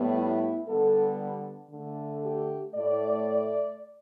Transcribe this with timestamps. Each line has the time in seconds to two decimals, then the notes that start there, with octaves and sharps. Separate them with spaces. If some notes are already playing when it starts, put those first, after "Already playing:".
Already playing: A2 G3 B3
0.16 E4
0.68 D3 G3 B3 A4
1.71 D3 A3
2.23 G4
2.75 A2 A3 D5